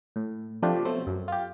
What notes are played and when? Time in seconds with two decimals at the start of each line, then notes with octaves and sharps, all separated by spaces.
0.16 A2
0.62 C3 F3 A3 D4 F4 G4
0.85 B2 F3 F#3 A3 C4
1.07 F#2
1.28 F4 G4